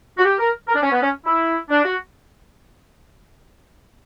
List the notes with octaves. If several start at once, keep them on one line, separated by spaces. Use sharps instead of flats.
F#4
G4
A#4
A#4
D4
C#4
B3
C#4
E4
D4
F#4